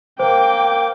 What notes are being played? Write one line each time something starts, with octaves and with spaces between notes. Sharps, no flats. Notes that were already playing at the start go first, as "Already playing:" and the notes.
A#3 A#4 C5 G5 D6